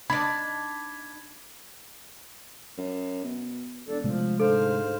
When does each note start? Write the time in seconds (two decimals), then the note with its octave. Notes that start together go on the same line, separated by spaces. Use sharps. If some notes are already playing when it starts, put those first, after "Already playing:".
0.10 D4 D#4 D5 B5 G#6
2.77 F#2
3.24 B2
3.88 E1 D4 A4
4.04 C3 F3 G#3 A3
4.40 D2 G#2 A4 C5 F5